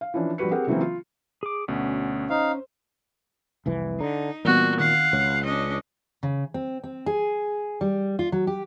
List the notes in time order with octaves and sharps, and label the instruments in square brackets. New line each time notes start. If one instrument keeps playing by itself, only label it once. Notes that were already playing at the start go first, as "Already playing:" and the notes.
[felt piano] F5
E3 F3 C#4 D4
A#1 G3 F#4 B4 C#7
C4 G4 G#4 A#4 F#5
C#3 E3 F#3 A#3 C4
F4
[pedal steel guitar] G#4 D6
[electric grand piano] D2 B2 [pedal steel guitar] C#4
[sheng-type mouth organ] D#4 F5 [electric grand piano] C5
[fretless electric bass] F1 C2 E3
[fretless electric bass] D3 [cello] D#4 [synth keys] A#5
[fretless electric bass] A#2 [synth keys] E3 G3 B3 [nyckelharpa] C4 F#4
[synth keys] D#3 [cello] F5 [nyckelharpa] F#5
[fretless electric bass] C#2 [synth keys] C#5
[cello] C#4 [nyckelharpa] D4 D#5
[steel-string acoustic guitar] C#3
C4
C4
G#4
G3
F4
F#3
G4